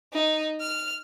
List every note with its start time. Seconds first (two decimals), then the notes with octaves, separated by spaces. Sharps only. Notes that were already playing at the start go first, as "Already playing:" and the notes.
0.13 D#4
0.61 F6